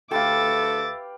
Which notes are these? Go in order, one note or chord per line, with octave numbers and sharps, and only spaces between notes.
D2 G4 A4 B4 E5 F5 D6 A6